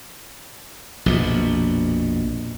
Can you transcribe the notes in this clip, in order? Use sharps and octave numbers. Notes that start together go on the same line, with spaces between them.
A#1 F2 B2